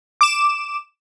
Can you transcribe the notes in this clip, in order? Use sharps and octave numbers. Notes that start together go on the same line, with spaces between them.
D6 E7